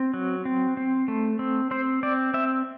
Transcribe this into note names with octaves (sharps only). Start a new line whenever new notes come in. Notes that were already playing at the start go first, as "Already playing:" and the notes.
Already playing: C4
F#3
C4
C4
A3
C4
C4 C5
C4 D5
C4 E5